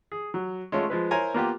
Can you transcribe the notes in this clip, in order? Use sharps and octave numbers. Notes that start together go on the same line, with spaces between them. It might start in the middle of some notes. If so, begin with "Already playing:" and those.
G#4
F#3
G#3 A3 C#4 F4
F3 G#3 B4
E4 A#4 C5 C#5 G#5 A#5
A#3 B3 F4 G4